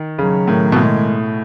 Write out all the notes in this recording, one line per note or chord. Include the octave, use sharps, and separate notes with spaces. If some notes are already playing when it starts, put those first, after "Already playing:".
Already playing: D#3
C#3 F#3
A2 D#3
B2
A2 G#3